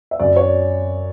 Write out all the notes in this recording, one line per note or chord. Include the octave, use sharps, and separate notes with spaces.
E5
F#2 D5
C#5